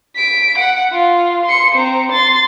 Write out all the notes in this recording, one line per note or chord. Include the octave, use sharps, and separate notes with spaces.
B6 D7
F#5
F4
C6 C#7
C4 A#5
C6 A6